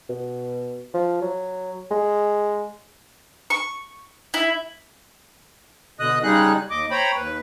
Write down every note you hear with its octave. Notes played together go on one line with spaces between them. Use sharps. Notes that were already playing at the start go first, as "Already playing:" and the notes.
B2
F3
F#3
G#3
C#6
E4
B2 D3 D#5 D#6 F#6
C#3 G3 G#3 D#4 G#4 F#6
D#2 D#5 D6
C5 C#5 G5 A#5 B5
D#2 B4